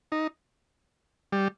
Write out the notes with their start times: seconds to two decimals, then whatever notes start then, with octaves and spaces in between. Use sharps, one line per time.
0.12 D#4
1.32 G3